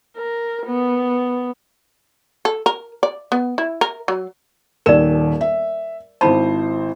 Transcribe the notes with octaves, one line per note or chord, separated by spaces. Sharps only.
A#4
B3
A4
A#4
D5
B3
E4
A#4
F#3
D#1 D#2 A#4 D5 E7
E5
G#1 E4 C5 A5 B5